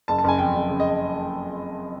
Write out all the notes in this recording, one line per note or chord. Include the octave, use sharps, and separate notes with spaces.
F#1 A5
A5
F#1 G#5
F2 G5
F#1
C#3
D#5